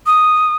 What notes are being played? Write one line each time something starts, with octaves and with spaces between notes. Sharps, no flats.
D#6